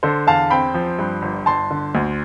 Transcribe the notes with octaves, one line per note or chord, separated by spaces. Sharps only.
D3 A4 C5
E2 F5 A5
C4 G5 B5
F3
G2
G1
G1 A5 C6
D3
D2